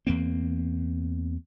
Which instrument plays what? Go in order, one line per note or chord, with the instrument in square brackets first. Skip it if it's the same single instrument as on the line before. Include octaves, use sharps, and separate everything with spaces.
[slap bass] E2 A#3 C4